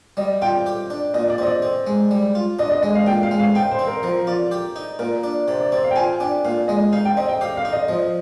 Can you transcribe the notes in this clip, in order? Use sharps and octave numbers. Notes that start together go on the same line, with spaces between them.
G3 D#5
F4 G5
G4
D4
A#2 D#5
D5
C4 D#5
D5
C4
G#3
G3
F4
D4 D#5
D#5
G#3 D#5
F5
A#2 G5
F5
G#3
F5
D#4 G5
C5
C4
A#4
F3 A#4
F4 D5
G4
D#4
A#2 A#4
D4
C3 D5
D5
C4 D5
F5
G5
F4 G#5
D4 G5
A#2 F5
G#3 D#5
D#4 F5
G5
C4 D#5
G5
G4 F5
F5
D#4
D#5
F3 D#5